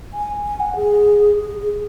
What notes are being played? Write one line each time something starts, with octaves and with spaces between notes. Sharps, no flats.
G#5
G#5
F#5
G#4
G#4
G#4